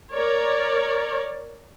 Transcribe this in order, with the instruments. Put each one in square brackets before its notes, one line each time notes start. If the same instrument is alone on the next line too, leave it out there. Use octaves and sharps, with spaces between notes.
[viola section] A#4 C#5 D5